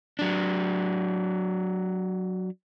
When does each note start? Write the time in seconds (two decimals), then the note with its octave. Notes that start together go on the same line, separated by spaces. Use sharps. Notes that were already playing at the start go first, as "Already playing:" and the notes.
0.19 F#3 D4